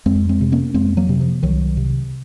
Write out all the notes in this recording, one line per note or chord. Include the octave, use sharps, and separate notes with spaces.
F2 G#3 C4
G#3 C4
C3
A#3 C#4
F2 G#3 C4
F#3 A#3
C3
F3
C2 D#3 F#3
C3